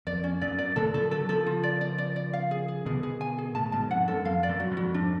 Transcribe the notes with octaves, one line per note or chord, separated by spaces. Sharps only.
F2 D5
C#4
F#2 D5
D5
A2 C#3 A4
C#3 F3 A4
D3 F#3 A4
C#3 F3 A4
F4
D5
D5
D5
D5
F5
G#4
G#4
B2 D3 G#4
G#4
G#5
G#4
A2 C#3 A5
G#2 B2 A5
F2 G#2 F#5
F#2 A4
F2 F5
D5
F#2
F#4
F2 G#2
F#4
F2 G#2 D4